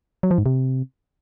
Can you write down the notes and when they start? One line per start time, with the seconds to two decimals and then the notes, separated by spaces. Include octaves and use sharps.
0.23 F#3
0.31 F3
0.38 G#2
0.46 C3